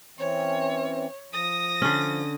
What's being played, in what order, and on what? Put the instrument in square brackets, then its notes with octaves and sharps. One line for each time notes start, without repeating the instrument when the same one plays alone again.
[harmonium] E3 C4 C#4 [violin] C#5
[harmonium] F3 [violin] D#6 A#6
[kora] D3 C#4